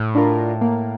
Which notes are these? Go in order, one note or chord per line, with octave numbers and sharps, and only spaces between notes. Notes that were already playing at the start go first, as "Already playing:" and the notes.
Already playing: A2
D4 F4 A#4
A#3